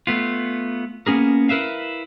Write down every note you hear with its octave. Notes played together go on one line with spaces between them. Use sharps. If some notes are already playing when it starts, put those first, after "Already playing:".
A3 B3 F4
A#3 B3 C#4 G#4 A#4
E4 A#4 B4 E5 F5